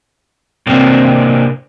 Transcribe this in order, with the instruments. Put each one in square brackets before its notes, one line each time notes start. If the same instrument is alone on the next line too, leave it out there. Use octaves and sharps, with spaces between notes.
[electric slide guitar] C3 A#3 C4 D4